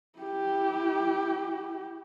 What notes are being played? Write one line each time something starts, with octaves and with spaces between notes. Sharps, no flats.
E4 G4